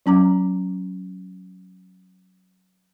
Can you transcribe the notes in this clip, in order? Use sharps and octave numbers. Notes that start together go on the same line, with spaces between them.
F#3 C#4 A#5 D6